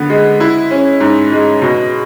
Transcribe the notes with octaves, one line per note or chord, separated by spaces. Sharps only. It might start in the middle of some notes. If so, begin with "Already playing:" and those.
Already playing: D3 B3
G#3
E4
C#4
G#2
G#3
B2